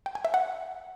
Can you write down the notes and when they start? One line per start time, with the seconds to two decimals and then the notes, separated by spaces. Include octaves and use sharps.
0.06 G5
0.15 G#5
0.25 E5
0.34 F#5